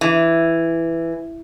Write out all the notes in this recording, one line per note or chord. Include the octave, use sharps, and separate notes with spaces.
E3